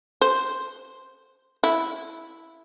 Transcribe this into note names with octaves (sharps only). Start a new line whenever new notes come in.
C5
E4